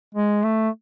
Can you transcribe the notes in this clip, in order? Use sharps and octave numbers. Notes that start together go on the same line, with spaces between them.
G#3
A3